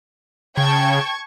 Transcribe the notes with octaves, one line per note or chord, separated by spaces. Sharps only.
C#3 G5 A5 C#6 G#6